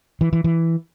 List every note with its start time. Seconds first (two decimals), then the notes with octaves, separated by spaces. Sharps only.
0.21 E3
0.33 E3
0.44 E3